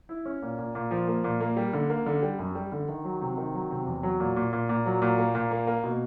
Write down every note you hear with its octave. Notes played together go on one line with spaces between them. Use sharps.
E4
C#4
A#2
A#2
A#2
F3
A#3
A#2
A#3
G3
D3
A#3
D3
G3
F#2
G3
D3
D#3
F#3
C3
D#3
F#3
C3
E2
F#3
A#2
A#2
A#2
A#2
F#3
A#2
A#3
A#2
A#3
A#3
B2